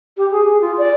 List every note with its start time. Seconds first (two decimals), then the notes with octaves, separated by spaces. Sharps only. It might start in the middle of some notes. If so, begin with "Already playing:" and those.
0.17 G4
0.31 G#4
0.61 F4
0.78 D5